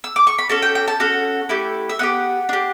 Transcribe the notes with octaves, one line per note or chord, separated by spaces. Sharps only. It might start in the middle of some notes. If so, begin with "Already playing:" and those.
E6
D6
C#6
B5
C#4 F#4 A4 A5
G5
G5
A5
C#4 F#4 A4 F#5
A3 E4 G4
E5
B3 E4 G4 F#5
D4 G4